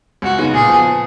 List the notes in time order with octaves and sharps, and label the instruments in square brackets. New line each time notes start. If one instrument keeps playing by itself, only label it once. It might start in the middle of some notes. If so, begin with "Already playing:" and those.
[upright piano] C#2 [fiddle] F#4
[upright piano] C#3 G#3 B3 D#4
[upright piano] A#2 [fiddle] G#4
[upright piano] F3 B3